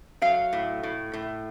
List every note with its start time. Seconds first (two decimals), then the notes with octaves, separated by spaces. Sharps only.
0.22 F#3 F5
0.53 A2
0.83 A2
1.13 A2